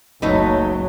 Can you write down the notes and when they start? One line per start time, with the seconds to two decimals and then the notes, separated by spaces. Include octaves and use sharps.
0.22 F#1 C#2 F#3 A3 D#4 B4